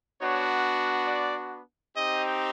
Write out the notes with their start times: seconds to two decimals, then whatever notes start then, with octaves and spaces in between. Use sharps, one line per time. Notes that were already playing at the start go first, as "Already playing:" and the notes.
0.19 B3 D4 F#4 C#5
1.07 D5
1.95 C4 D#4 G4 D#5